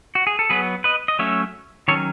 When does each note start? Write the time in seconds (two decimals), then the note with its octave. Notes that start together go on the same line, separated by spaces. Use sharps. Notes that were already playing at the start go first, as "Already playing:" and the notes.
0.15 F#4
0.27 G#4
0.39 A4
0.50 F#3 B3 G#4 B4
0.84 B4 D#5
1.08 D#5
1.19 F#3 A3 C#4 C#5 E5
1.88 D#3 F#3 C#4 A4 C#5